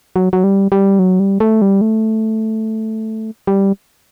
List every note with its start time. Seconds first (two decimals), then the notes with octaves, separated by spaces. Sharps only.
0.16 F#3
0.33 F#3
0.44 G3
0.72 G3
0.99 F#3
1.20 G3
1.40 A3
1.62 G3
1.81 A3
3.47 G3